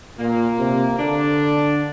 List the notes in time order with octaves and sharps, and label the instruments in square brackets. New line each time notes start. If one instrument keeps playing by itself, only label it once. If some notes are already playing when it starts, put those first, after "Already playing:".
[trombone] A#2 [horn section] A#3
[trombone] C3
[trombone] D3 [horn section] D4